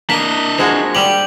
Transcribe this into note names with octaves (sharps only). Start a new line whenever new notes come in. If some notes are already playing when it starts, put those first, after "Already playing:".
A#3 D4 D#5 B6
F3 G#3 F#4
G3 G4 F#7